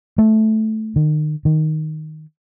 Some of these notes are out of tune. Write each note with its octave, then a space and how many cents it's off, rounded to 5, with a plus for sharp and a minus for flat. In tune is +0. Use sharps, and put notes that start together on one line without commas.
A3 -10
D#3 -35
D#3 +0